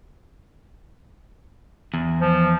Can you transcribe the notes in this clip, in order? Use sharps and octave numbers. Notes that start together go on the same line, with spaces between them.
E2
F3